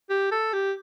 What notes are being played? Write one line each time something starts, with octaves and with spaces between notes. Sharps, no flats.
G4
A4
G4